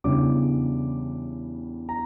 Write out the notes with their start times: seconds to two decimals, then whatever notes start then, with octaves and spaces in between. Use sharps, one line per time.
0.04 E2 C#3 E3 G3 D4 D6
1.89 A#5